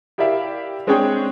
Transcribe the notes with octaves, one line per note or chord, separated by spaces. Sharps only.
E4 G4 A#4 D5 E5 F5
G#3 C4 D4 G#4 C#5 G5